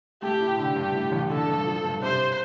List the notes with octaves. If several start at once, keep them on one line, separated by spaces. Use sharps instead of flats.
A3 G4
A2
D3 G4
G2
A2
A1
D3 A4
G2
F3
G2
C3 C5